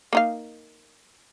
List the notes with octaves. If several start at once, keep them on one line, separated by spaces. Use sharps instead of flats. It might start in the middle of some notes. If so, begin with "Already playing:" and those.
A#3 D#4 F5